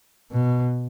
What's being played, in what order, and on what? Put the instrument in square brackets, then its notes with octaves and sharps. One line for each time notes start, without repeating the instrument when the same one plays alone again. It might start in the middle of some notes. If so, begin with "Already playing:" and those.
[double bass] B2